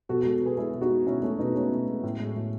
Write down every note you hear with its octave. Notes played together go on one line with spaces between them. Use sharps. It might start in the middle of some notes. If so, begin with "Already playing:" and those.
B2 F#4 A4
G#3 F#4 A4
B2 G#4 B4
G#3 E4 G#4
B2
D#4 F#4
G#3
B2 C#4 E4
G#3 A3 C#4
B2 B3 D#4
G#3 A3 C#4
B2
G#3
A2
G#3
A2